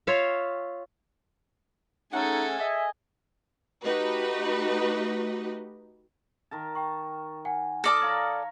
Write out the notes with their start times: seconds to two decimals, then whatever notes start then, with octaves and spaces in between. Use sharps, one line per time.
0.07 F4 C#5 E5 F5
2.13 A3 C#4 D#4 G#4 A4 F#5
2.60 D#5 E5 G#5
3.84 A3 D#4 F#4 G4 B4 D#5
6.51 D#3 A#4 A5
6.75 G5 C#6
7.45 F#5 G#5
7.84 A4 D5 A5 D#6 F6 A#6
8.02 C#5 F5 A#5